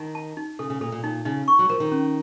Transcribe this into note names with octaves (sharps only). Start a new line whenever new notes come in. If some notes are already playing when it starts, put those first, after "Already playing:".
Already playing: D#3 D#4
A5
D#4
C#3 A4
C#3
A#2 A4
A#2
A#2 D#4
C#3 D#4
C#6
F#3
F3 A#4
D#3
C#4